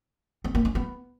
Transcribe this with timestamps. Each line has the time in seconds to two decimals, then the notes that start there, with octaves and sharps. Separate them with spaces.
0.44 C4
0.55 A#3
0.65 C#4
0.75 B3